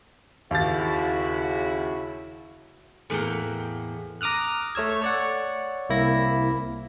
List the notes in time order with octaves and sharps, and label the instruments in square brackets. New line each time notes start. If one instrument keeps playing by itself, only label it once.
[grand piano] D#2 A6 [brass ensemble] C#3 E4 F#4
[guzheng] E2 A2 A#3 F#5 G5
[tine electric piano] A#5 D6 D#6 F6 F#6
A3 C#5 E6 G#6
C#5 D5 F#5
C2 A#3 E4 A#6